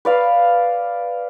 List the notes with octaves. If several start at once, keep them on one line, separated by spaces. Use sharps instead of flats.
B4 D5 F5